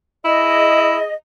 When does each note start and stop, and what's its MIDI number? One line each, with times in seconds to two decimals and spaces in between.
0.25 0.96 64
0.25 1.12 68
0.25 1.12 75